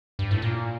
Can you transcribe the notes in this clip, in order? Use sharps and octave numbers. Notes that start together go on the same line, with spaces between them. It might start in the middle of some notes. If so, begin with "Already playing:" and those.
G2
A2
A#2